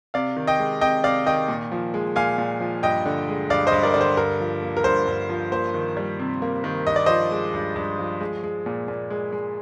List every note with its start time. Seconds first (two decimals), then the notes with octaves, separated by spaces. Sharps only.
0.14 C3 D5 F5
0.37 D#3
0.47 D#5 G5
0.59 G#3
0.81 C3 D#5 G5
1.03 C3 D5 F5
1.26 D#3 D#5 G5
1.48 A#2
1.72 F3
1.94 G#3
2.16 A#2 F5 G#5
2.38 A#2
2.60 F3
2.83 G2 D#5 G5
3.06 D3
3.28 G#3
3.50 G2 D5 F5
3.67 C5 D#5
3.72 G2
3.83 A#4 D5
3.94 D3 D5
4.01 C5
4.17 G2 A#4
4.40 F3
4.62 A#3
4.77 A#4
4.84 G2 C5
5.07 G2
5.29 F3
5.52 A#3 C5
5.74 D#3
5.97 G3
6.19 C3
6.42 A#3
6.64 D#3
6.87 G2 D#5
6.96 D5
7.06 F3 C5 D#5
7.31 G#3
7.54 G2
7.76 G2
7.99 F3
8.20 G#3
8.43 G#3
8.66 A#2
8.88 A#2
9.10 G#3
9.32 G#3